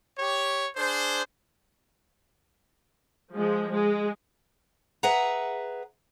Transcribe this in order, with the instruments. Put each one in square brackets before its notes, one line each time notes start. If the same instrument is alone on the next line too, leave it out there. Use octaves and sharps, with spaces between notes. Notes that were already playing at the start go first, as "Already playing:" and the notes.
[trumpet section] G4 C#5
D4 G#4 C5
[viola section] F3 G#3
G#3
[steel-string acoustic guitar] G#4 B4 E5 F#5 A#5